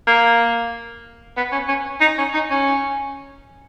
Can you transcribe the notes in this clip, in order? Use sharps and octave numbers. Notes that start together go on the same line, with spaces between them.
A#3
B3
C#4
C#4
D#4
C#4
D#4
C#4